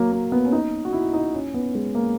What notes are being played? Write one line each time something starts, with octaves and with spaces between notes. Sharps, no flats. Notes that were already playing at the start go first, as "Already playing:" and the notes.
Already playing: F#3 A#3
A#3
B3
C#4
D#4
F#4
E4
D#4
C#4
B3
G#3
A#3